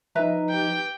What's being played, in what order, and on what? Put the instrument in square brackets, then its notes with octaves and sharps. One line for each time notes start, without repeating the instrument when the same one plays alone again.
[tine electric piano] F3 D#4 [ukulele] B4 E5 A#5
[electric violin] G4 G5